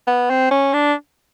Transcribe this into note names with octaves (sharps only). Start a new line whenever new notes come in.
B3
C4
C#4
D4